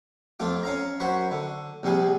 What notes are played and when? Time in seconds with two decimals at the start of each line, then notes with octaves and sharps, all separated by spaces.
0.40 F2 A3 F4 D6
0.63 C#4 F5 A#5
1.00 F#2 C5 F#5 B5 C#6
1.31 D3
1.83 A#1 C3 G3 G#4